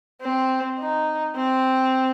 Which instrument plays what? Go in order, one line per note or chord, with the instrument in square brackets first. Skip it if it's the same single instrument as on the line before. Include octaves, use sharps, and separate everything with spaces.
[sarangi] C4
D#4
C4